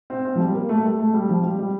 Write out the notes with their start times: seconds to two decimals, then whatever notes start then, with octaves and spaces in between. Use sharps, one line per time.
0.10 C4
0.25 C4
0.36 F3
0.40 G3
0.54 A#3
0.69 A3
0.78 G3
0.85 A3
0.99 A3
1.14 G3
1.29 F3
1.43 G3
1.59 G3